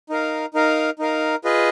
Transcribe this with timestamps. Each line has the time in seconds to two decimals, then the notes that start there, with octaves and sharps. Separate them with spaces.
0.10 D#4 A#4 F5
0.54 D#4 A#4 F5
0.99 D#4 A#4 F5
1.44 F4 G#4 B4 D#5